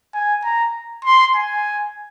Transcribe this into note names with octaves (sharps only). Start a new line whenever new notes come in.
G#5
A#5
C6
G#5